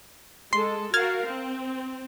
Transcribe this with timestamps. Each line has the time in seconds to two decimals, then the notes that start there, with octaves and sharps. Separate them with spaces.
0.53 G#3 A4 C6
0.94 F#4 A#4 F5 F6 G#6 A6
1.26 C4